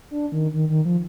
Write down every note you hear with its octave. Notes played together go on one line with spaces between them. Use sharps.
D4
D#3
D#3
D#3
F3